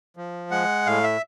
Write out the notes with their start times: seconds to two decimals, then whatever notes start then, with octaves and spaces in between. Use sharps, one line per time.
0.17 F3
0.51 G#3 F#5
0.86 A2 F5
1.04 E5